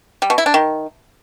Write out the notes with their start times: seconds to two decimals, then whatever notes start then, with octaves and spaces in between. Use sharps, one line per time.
0.22 G3
0.30 B2
0.38 E4
0.46 D4
0.54 D#3